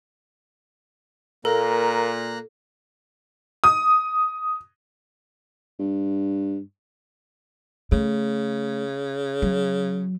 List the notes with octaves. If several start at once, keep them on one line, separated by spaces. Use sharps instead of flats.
A#2 A#3 A4 A#4 A#5 F#6
D#6
G2
C#3 A3
F#3